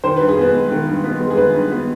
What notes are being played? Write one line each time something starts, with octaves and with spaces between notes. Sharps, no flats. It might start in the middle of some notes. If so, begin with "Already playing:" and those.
D#3 C5
G2 B4
G#4
B3 B4
G#3
D#3
G2
B3
G#3
G#4
D#3 B4
G2
B3